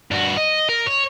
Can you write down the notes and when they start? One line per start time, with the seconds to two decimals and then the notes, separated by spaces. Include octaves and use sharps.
0.11 G2 F#4
0.37 D#5
0.69 A#4
0.86 C#5